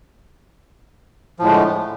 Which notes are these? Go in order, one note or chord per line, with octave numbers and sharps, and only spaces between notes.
A2 D3 F3 G#3 A3